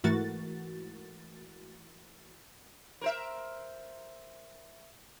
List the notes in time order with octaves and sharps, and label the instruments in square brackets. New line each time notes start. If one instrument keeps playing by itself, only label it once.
[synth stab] G#2 E3 A3 F#4 A#4 A6
[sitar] A#4 C5 E5